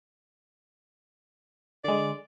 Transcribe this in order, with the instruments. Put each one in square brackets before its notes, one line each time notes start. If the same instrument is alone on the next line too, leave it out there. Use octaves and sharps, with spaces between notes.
[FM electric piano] D3 G#3 [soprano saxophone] D5